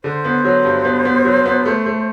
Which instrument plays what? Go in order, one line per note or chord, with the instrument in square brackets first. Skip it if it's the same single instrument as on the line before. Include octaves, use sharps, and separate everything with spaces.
[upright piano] D3 [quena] C5
[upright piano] B3
F#3
G2
B3
B3
F#3
B3
A3
A3